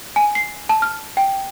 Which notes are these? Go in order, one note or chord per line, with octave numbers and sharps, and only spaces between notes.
G#5
C7
A5
F6
G5